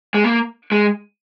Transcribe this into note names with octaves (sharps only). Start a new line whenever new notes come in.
G#3
A#3
G#3